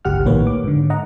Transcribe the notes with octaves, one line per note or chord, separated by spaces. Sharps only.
G1 C#2 G4 F#5 F6
A#1 A2 D#3 A#3 B4 C#5
D6
G#2 D3
D#5 F#5 A#5